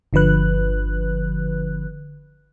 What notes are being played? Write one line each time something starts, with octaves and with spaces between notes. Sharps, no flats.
G1 D3 F3 B4 F#6